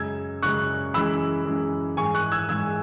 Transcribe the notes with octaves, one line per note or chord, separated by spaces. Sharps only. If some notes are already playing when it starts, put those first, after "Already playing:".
Already playing: F#2 C#3 G#3 E6 G#6
F#2 C#3 G#3 C#6 F#6
F#2 E3 G#3 B5 E6
F#2 E3 G#3
G#2 E3 G#3 G#5 C#6
C#6 F#6
E6 G#6
G#2 E3 G#3 E6 G#6